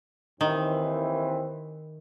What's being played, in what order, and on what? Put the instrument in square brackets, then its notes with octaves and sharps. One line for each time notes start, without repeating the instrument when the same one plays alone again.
[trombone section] D#2 E3 C4 [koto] D#3